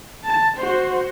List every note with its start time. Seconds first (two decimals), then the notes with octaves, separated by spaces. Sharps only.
0.24 A5
0.57 F#4 C5